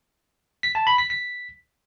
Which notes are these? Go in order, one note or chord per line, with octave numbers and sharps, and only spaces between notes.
B6
A5
B5
B6
B6